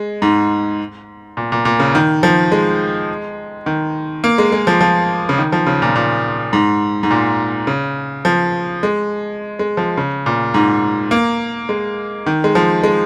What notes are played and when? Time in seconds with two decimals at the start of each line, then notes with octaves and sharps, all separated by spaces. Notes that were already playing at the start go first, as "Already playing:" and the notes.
Already playing: G#3
0.22 G#2
1.37 A#2
1.52 A#2
1.65 A#2
1.80 C#3
1.95 D#3
2.23 F3
2.52 G#3
3.66 D#3
4.24 A#3
4.38 G#3
4.52 G#3
4.67 F3
4.81 F3
5.29 C#3
5.38 D#3
5.53 F3
5.67 C#3
5.82 A#2
5.96 A#2
6.53 G#2
7.03 G#2
7.11 A#2
7.67 C#3
8.25 F3
8.83 G#3
9.59 G#3
9.77 F3
9.97 C#3
10.26 A#2
10.54 G#2
11.11 A#3
11.69 G#3
12.26 D#3
12.44 G#3
12.55 F3
12.83 G#3